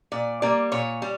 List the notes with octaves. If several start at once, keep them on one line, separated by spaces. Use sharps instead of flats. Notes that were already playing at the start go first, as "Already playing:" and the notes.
A#2 D5
G3 A#3 D5
A#2 C#5
G3